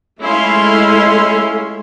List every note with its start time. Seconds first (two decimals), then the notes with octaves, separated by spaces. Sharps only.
0.22 G#3 A3 C#4 E4 F4 E5 C6